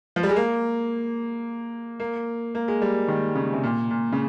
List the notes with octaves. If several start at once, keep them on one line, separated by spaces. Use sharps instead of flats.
F3
G3
G#3
A#3
A#3
A#3
G#3
G3
D#3
C#3
C3
A#2
A#2
C#3